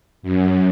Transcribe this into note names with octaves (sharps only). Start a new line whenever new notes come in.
F#2